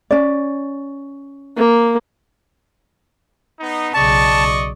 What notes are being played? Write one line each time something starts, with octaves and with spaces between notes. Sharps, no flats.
C#4 D5
A#3
B3 D#4
B1 C#3 D5 D#5 A5 C#6